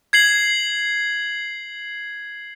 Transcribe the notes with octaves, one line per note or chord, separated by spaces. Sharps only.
G#6 C7 F#7